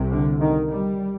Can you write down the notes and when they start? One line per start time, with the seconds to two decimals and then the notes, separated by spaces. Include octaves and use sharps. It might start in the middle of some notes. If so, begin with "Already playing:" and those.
Already playing: C2 C3
0.12 D3
0.40 D#3
0.68 G3